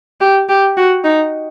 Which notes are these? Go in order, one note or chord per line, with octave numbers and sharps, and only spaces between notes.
G4
G4
F#4
D#4